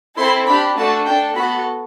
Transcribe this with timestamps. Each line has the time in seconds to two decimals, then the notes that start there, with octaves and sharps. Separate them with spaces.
0.17 C4 E4 A4 C6
0.46 D4 G4 B5
0.76 A3 D4 F#4 A5
1.06 D4 A4 G5
1.35 B3 F#4 A4 B5